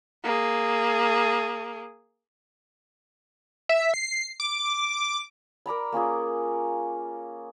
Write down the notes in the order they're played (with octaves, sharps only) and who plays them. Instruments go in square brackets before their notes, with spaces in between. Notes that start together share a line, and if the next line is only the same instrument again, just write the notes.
[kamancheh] A#3 G#4
[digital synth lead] E5
C7
D6
[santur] A#4 D5 A#5 B5
A#3 C#4 F4 G#4